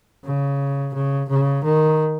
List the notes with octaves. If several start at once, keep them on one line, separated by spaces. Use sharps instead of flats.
C#3
C#3
C#3
D#3